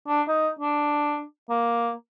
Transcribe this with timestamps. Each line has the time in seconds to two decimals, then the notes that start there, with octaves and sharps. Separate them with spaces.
0.08 D4
0.28 D#4
0.59 D4
1.50 A#3